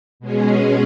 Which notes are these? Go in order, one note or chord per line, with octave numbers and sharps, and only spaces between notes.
B2 G#3 C#4 G#4